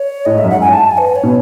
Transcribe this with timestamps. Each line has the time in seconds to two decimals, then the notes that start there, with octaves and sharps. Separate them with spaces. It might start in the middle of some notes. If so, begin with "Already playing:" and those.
Already playing: C#5
0.25 A2 D#5
0.35 G#2
0.38 E5
0.44 F#2
0.50 G#2 F#5
0.61 G#5
0.73 A5
0.86 G#5
0.98 B4
1.16 C#5
1.23 B2